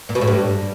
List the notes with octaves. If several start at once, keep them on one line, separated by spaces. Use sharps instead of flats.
A#2
B2
A2
G2